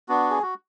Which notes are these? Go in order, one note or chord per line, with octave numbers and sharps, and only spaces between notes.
B3 D4 F#4
G#4
F#4